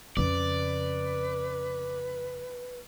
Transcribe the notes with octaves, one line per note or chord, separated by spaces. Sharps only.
F2 C#3 B4 D5